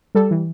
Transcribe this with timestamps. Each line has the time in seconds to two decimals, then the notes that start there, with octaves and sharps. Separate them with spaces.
0.15 G3 A4
0.31 E3